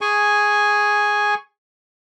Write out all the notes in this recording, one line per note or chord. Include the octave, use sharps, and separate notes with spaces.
G#4 G#5 C#6